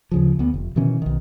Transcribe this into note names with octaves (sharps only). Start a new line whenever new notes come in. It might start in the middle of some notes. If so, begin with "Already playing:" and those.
D2 C#3 F3
D2 B3
F1
B2 D#3 E3 C#4
B1 D#3